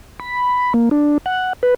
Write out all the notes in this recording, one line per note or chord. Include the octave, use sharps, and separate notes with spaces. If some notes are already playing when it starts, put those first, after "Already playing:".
B5
A#3
D4
F#5
B4